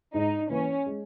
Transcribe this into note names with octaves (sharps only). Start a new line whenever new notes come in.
G#2 D#4
E3 A#3 C#4 E4 B4
G#3